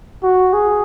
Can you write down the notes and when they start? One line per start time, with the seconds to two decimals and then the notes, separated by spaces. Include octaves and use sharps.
0.23 F#4
0.53 G#4